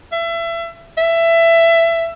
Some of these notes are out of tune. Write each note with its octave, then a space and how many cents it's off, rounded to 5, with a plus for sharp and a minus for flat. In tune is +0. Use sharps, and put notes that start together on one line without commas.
E5 +30
E5 +20